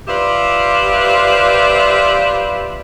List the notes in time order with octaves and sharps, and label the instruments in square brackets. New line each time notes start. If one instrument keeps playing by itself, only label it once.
[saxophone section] F4 G4 B4 C5 D5 E5